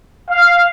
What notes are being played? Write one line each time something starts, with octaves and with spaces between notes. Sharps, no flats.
F5